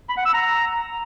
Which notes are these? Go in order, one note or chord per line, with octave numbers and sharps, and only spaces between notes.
B5
F#5
E6
A#5